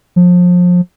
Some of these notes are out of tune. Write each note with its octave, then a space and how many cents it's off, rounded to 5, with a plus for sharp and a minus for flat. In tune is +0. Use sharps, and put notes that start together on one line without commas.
F3 +30